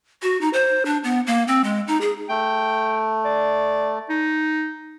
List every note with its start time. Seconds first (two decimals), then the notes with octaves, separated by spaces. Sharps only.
0.23 F#4
0.41 D#4
0.53 C5
0.86 D4
1.04 B3
1.27 A#3
1.48 C4
1.64 G#3
1.88 D#4
2.01 G#4
2.29 A3 G5
3.25 D5
4.10 D#4